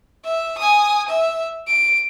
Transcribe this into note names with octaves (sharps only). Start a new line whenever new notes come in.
E5
G#5 D#6
E5
D7